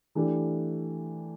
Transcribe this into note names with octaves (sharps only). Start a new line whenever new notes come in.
E3 A3 D4 G4